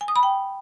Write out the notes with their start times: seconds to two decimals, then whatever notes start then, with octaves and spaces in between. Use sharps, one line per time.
0.01 G#5
0.08 D#6
0.16 B5
0.23 G5